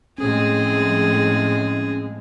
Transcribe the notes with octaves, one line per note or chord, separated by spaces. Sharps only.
A2 F3 G#3 C4 C#4 G#4